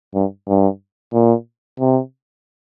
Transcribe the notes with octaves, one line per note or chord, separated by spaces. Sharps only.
G2
G2
A#2
C3